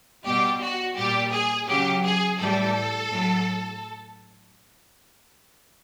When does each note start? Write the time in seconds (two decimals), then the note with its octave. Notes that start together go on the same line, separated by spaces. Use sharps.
0.25 B2 G3 G4
0.61 F#4
0.96 A#2 G3 G4
1.32 G#4
1.68 C#3 F#3 G4
2.04 G#4
2.39 A2 E3 G3 A4
3.11 A2 F#3